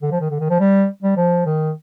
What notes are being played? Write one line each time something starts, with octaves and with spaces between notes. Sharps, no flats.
D3
F3
D#3
D3
D#3
F3
G3
G3
F3
D#3